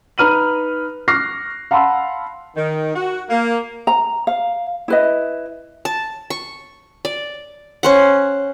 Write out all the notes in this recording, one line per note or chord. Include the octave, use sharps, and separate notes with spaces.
D#4 B4 F6 D#7 F#7
C#6 D6 F6 F#6 A#6 C7
F5 F#5 A5 B5 C6 E6
D#3
F#4
A#3
A#5
F5
E4 B4 D#5
A5
C#6
D5
C#4 C5 F#5